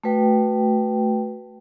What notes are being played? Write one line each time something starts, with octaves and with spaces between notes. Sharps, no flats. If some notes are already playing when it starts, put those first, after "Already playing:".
A3 F#4 B4 G5